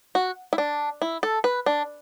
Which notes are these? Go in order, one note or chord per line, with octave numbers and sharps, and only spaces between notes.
F#4
E4
D4
E4
A4
B4
D4